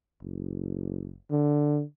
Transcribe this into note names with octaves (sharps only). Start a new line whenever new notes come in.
F#1
D3